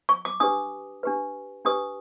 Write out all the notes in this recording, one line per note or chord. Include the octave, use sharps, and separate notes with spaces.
C#6
D6
D4 G4 B4 D#6
D4 G4 B4
D4 G4 B4 D#6